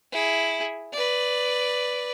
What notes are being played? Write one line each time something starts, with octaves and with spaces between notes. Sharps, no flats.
E4 G#4
B4 D5